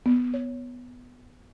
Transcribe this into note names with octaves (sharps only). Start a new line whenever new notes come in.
B3
C#5